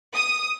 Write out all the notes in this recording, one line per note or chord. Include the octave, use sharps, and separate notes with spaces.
D#6